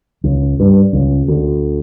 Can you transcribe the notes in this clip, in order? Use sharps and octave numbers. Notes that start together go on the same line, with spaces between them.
C#2
G2
C#2
D2